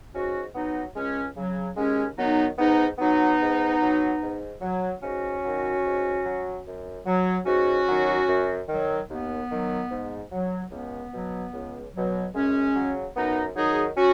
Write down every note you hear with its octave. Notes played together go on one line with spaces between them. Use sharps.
G#2 C#4 F#4
F#3 B3 D#4
C#2 G#3 C#4
C#3 F#3
D#2 G#3 C#4
D#3 F#3 B3 D#4
G#2 B3 D#4
F#3 B3 D#4
G#2
F#3
G#2
F#3
G#2 C#4 F#4
D#3 F#3
G#2
F#3
F#2
F#3
G#2 C#4 F#4
D#3 F#3
F#2
D#3 F#3
D#2 B3
D#3 F#3
G#2
F#3
C#2 B3
B2 F#3
C#2
B2 F#3
F#2 G#3 C#4
C#3 F#3
F#2 B3 D#4
D#3 F#3 D#4 G#4
C#4 F#4